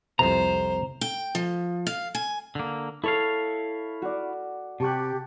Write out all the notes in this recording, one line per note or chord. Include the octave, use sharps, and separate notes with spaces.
C2 F2 C3 C5 A#5
G5
F3
F5
G#5
D3 A#3
E4 A4 C#5 F5
F#4 D5
C3 G4 A5 C#6 F#6